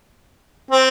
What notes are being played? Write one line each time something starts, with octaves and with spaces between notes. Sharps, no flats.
C4